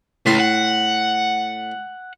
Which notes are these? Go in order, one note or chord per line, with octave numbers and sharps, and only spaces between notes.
C#2 A2 C6
F#5